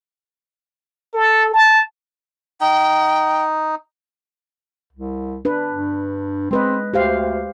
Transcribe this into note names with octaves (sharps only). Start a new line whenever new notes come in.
A4
A5
D#4 G5
C2
D4 B4
G2
G#3 C4 B4 D#5
D2 G4 C5 F5